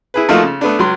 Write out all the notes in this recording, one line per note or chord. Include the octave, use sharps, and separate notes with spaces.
E4 G#4 B4
F3 A3 A#3 D#4 F4 F#4
C#3
A3 B3 D4
C#2 F#3 C6